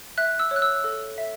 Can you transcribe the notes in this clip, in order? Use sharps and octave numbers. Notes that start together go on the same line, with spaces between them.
E5 F#6
E6
C#5
F#6
E6
A4
E5